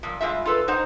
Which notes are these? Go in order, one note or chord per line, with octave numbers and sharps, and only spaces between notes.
A#2 F3
G3 G#3 F4 E5
F4 A4 B4
F2 D#4 C5 F#5